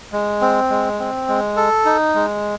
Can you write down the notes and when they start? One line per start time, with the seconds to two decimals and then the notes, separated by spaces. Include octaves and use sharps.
0.13 G#3
0.41 C4
0.70 G#3
0.99 C4
1.28 G#3
1.56 A4
1.85 D#4
2.15 G#3